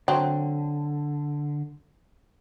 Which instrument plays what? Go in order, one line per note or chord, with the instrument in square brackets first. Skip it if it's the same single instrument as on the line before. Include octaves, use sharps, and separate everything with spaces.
[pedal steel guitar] D3 [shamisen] F#3 C4